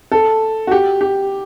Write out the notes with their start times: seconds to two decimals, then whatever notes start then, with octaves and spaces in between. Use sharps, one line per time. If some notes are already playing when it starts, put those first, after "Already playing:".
0.12 A4
0.67 F#4
0.71 G4
1.01 G4